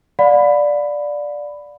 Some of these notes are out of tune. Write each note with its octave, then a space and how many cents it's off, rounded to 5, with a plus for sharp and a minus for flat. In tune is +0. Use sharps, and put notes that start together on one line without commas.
D5 +0 F5 +45 B5 +10